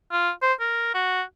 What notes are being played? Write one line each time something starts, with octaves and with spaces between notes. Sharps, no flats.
F4
C5
A#4
F#4